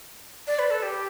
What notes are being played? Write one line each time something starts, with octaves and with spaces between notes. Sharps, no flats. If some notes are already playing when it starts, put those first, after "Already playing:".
D5
B4
A4
G4